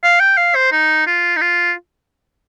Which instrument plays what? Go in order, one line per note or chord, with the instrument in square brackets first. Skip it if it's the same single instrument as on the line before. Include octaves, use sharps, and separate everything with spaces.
[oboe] F5
G5
F5
C5
D#4
F4
D#4
F4